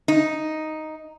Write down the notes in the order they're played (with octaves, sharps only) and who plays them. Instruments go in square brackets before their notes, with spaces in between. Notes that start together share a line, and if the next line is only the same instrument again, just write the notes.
[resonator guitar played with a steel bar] D#4